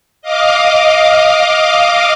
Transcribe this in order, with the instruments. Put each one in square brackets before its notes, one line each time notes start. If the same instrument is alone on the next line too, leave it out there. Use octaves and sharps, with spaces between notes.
[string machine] D#5 F5 D6